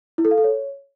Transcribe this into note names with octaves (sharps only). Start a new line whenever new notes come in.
E4
A4
F5
A4
C#5